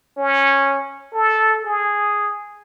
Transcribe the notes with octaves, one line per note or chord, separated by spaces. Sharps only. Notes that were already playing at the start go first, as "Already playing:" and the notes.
C#4
A4
G#4